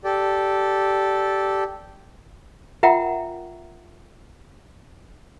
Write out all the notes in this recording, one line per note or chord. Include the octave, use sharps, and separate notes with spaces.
G4 A4 D5
F4 A#4 E5 F#5 G5 A#5